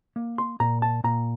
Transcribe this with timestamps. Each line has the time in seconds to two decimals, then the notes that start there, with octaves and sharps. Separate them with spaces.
0.16 A#3
0.38 C6
0.60 A#2 A#5
0.82 A5
1.04 A#2 A#5